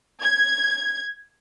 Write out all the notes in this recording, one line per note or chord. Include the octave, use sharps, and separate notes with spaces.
G#6